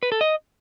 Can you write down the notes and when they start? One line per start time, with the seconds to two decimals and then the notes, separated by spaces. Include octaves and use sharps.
0.03 B4
0.12 A4
0.21 D#5